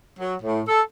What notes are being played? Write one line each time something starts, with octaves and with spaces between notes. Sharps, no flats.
F#3
A2
A4